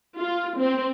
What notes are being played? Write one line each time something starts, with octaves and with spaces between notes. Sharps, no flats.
F4
C4